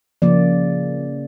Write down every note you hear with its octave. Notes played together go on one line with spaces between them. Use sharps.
C#3 F3 A#3 D5